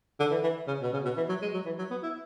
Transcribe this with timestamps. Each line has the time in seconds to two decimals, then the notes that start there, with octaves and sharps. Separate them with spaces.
0.19 D3
0.31 E3
0.43 E3
0.67 C#3
0.82 B2
0.93 C#3
1.05 B2
1.17 E3
1.29 F#3
1.42 G#3
1.54 F#3
1.65 E3
1.78 F#3
1.90 B3
2.03 E4